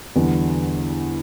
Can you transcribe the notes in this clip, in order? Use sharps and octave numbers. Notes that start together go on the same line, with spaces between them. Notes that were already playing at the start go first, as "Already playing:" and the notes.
E2 D3 G3 B3